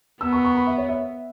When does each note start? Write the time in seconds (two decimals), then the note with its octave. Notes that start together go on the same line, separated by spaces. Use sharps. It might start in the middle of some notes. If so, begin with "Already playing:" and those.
0.21 B3 E6
0.33 C#6
0.45 C#6
0.55 B5
0.67 E5
0.78 C#5
0.88 E5